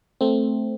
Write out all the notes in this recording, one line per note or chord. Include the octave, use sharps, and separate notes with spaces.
A3 C4